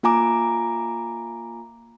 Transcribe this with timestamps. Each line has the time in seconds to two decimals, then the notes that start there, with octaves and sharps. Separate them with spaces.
0.03 A#3 F4 G#5 A#5 D6